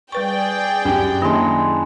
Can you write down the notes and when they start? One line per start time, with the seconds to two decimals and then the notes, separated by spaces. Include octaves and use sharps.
0.12 G3 G#4 B4 D5 G5 C#6
0.85 F#2 G4
1.21 D#3 G#3 A#3 D4 E4 A#6